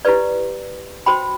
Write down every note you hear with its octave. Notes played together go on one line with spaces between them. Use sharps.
E4 G4 B4 D5
F#4 C5 G5 B5